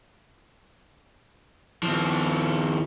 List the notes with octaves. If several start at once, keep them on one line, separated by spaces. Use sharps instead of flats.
D#2 F3